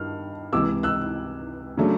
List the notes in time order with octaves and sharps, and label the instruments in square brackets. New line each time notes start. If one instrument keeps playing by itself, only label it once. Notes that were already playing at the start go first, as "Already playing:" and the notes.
Already playing: [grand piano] G2 D#3 F6
C#2 C3 E3 D6 E6
E6 F#6
C#3 F#3 A3 D4